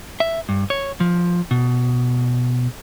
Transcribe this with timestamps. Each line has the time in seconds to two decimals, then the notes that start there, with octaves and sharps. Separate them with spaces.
0.20 E5
0.49 G2
0.70 C#5
1.00 F3
1.51 B2